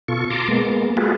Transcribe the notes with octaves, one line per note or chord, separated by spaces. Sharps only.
B2 F4 A4 C#6
A5 A#5 C6 D6
G#3 A#3 B3
G#3 F4 F#4 G#4 A4 B4